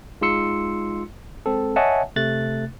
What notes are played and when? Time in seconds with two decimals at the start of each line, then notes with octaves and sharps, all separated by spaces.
0.21 G#3 D#4 F4 C6 E6 C#7
1.46 G#3 C4 A4
1.76 C#5 D#5 E5 F#5 G#5 A5
2.16 C3 A3 F#6 A6